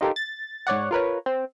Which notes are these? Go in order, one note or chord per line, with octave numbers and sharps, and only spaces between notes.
D#4 F4 G4 A4 A#4
A6
G#2 C#5 D5 F#5
F4 A#4 B4 C#5
C4